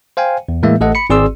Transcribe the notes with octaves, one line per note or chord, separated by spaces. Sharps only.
C5 F5 G5 G#5
E2
A2 E3 G#3 A#3 E5
A1 A3 A4 D#5 F#5
B5 C#7
G#1 C4 G#4 D5 C6 E6